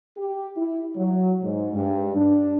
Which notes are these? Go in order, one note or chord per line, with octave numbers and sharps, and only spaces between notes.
G4
E4
F#3
G#2
G2
D4